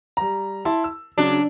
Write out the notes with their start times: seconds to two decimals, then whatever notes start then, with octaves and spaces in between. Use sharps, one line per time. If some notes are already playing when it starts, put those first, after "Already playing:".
0.17 G3 A#5
0.65 E4 A5 C6
0.84 E6
1.18 C#3 F#3 D4